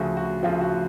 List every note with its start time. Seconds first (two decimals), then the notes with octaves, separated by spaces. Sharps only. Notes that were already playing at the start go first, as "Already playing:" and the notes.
Already playing: D2 C#3 F3 F#4
0.17 F#4
0.43 D2 C#3 F3 F4
0.61 F#4